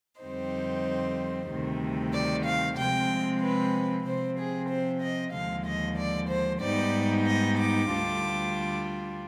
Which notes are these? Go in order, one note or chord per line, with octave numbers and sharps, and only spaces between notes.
F2 D3 G3 C4 D#4 C5
D2 C3 D#3 G3
D5
F5
C3 F3 G#3 C4 G5
B4
C3 F3 C4 C5
G#4
C5
D#5
D#2 D3 F3 G#3 F5
D#5
D5
C5
G#2 G3 B3 D#4 D5
D#5
D6
D2 D3 G3 D4 F4